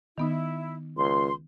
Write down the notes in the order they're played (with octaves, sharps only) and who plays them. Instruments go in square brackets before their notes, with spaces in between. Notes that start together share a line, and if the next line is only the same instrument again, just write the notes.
[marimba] D#3 B3 D#4 [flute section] E4
[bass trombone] C#2 [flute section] C6